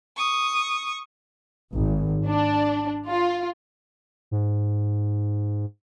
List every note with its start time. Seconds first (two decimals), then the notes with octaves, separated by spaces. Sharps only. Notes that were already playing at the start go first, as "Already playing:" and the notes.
0.17 C#6 D#6
1.72 G#1
2.27 D4
3.08 F4
4.31 G#2